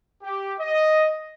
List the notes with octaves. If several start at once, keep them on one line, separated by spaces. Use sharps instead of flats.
G4
D#5